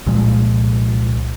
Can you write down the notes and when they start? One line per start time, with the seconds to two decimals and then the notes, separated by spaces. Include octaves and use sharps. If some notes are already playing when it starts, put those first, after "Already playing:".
0.06 C2 A#2 F3 G#3